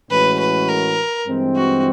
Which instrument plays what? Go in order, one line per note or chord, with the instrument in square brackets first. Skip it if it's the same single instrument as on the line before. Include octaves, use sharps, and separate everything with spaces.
[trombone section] A2 E3 G#3 C#4 F#4 [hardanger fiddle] B4
[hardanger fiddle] B4
A#4
[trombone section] G2 E3 G#3 C4
[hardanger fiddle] F#4